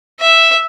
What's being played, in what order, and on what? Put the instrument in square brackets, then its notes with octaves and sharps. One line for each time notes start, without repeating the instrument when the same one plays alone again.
[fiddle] E5